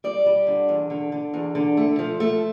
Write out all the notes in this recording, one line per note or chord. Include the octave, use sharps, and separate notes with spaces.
G3 D5
G3
D3
E2
D3
D3
E2
D3
A3
F3
A3